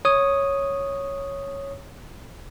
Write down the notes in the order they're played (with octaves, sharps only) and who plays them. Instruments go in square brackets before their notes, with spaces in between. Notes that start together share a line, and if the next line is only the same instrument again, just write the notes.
[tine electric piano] C#5 D#6